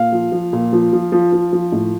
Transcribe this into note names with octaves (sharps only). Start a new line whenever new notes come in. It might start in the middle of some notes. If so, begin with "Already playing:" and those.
Already playing: A#2 F5
F3
F3
A#2
F3
F3
F3
F3
F3
A2